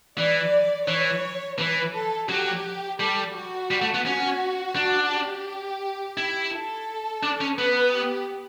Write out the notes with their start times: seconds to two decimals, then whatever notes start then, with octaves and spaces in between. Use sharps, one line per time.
0.18 E3 D5
0.88 E3 C#5
1.59 E3 B4
1.95 A4
2.29 F#3 G4
3.00 G3 A4
3.35 F#4
3.71 G3
3.82 A3
3.94 B3
4.06 C#4 F#4
4.76 D4
5.12 G4
6.17 E4
6.52 A4
7.23 D4
7.41 C#4
7.58 B3 B4
7.93 G4